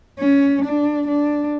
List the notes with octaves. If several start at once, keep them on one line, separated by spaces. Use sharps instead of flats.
C#4
D4
D4